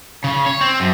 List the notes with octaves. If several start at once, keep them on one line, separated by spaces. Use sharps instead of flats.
C#3
C#5
C4
F#2